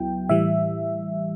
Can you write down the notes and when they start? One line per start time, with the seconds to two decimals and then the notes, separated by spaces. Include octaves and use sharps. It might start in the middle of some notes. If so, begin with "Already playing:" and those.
Already playing: C#2 F#3 B3 E4 G5
0.29 A2 E3 G3 E5